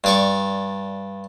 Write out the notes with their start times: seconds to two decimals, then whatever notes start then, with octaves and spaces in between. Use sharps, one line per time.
0.04 G2 D5 C#6